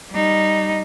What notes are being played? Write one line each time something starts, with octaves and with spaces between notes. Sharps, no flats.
G3 D#4